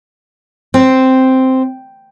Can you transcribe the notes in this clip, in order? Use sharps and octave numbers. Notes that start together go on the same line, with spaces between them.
C4